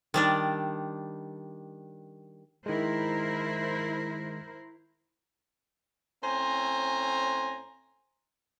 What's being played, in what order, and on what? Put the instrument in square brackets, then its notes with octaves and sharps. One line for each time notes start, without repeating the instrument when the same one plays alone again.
[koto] D#3 G3 D4
[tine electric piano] D#3 G#3 [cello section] E4 A#4 C5
[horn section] A2 C4 C#4 C5 G#5 A#5